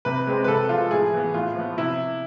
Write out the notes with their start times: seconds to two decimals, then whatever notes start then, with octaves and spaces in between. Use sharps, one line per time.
0.05 C3 B4
0.27 G#3 C4
0.44 B4
0.48 C3 A4
0.69 F3 G#3 F4
0.91 A2 G#4
1.14 E3 B3
1.34 A2 F4
1.56 F3 B3
1.77 C3 E4